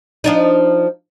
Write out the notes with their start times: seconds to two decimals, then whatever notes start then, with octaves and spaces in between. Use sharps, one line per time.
0.24 F3 D4 D#4